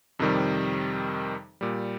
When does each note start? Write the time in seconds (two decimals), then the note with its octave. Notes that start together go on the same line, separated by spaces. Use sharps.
0.19 F2 C3 D#3 G3
1.61 A#2 G3